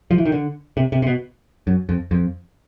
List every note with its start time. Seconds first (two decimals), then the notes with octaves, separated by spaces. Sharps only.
0.11 F3
0.18 E3
0.25 D#3
0.32 D3
0.77 C3
0.92 C3
1.02 C3
1.07 B2
1.67 F#2
1.89 F2
2.11 F2